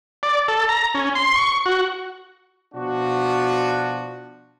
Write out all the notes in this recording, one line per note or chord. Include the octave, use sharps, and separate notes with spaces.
D5
A4
A#5
C#4
C6
C#6
F#4
B2 F3 D4 F#4